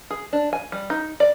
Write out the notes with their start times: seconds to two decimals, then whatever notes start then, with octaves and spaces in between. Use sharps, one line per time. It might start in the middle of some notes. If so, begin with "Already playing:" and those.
0.10 G#4
0.33 D4
0.53 G#5
0.72 G3
0.90 D#4
1.20 D5